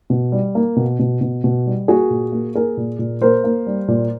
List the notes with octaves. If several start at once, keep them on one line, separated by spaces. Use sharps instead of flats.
B2
G3
A#3
B2
B2
B2
B2
G3
A#3 F#4 G#4
A#2
A#3
A#3 G#4 A#4
A#2
A#2
A#3 A#4 C5
A#3
G3
A#2